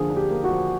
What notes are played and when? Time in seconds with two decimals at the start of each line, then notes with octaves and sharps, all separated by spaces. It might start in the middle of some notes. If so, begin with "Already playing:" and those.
Already playing: D3 F3 A#3 G#4
0.10 D4
0.17 G4
0.31 A#3
0.44 F#4
0.51 F3